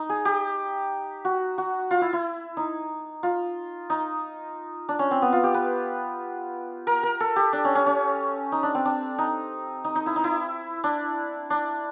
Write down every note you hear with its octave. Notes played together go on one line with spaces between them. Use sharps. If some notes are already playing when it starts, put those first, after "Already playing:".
Already playing: D#4
G#4
G4
F#4
F#4
F4
E4
E4
D#4
F4
D#4
D4
C#4
C4
B3
F4
G4
B4
A#4
A#4
A4
G4
D4
C#4
C#4
C#4
D#4
D4
C4
D4
D#4
D#4
D#4
E4
D#4
E4
D4
D4